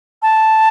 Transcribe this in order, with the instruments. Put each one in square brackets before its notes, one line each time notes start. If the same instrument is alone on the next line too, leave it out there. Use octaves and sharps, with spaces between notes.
[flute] A5